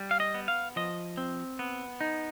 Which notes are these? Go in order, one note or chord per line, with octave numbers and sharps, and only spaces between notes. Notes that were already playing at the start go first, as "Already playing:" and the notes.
Already playing: G3
F5
D#5
B3
F5
F3 D#5
C4
B3
D#4